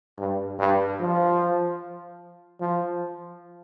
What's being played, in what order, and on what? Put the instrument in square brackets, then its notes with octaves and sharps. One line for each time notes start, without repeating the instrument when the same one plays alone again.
[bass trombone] G2
G2
F3
F3